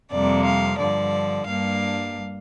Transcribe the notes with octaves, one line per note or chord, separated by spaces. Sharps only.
F2 C3 G3 A#3 D5
F5
G2 D3 F3 D5
G2 G3 A#3 D4 F5